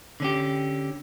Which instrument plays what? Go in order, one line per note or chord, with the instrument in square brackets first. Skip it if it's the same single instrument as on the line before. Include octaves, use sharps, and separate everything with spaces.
[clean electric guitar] D3 C#4 G4